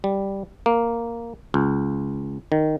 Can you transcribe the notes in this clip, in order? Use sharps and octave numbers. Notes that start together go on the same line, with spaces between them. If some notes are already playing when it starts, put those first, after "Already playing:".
G3
A#3
C#2
D#3